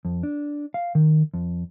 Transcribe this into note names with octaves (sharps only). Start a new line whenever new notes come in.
F2
D4
F5
D#3
F2